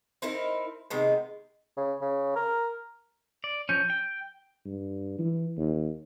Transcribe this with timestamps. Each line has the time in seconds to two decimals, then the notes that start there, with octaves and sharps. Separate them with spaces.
0.22 C4 D#4 E4 A#4
0.90 C3 D#3 G#3 B3
1.77 C#3
2.01 C#3
2.36 A#4
3.44 D5
3.69 F3 C#4 G6
3.90 G5
4.66 G2
5.19 E3
5.58 D#2